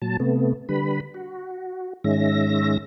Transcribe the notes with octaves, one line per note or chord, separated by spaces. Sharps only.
A#2 F#3 A5
C3 A3 B3
D3 G3 B4 B5
F#4
G#2 D#3 G#3 C#4 E5 A#6